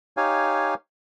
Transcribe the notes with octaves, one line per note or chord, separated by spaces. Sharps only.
D#4 G4 C#5 F5 G#5